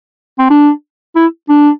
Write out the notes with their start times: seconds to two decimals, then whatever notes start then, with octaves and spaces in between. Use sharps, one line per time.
0.38 C4
0.50 D4
1.16 E4
1.49 D4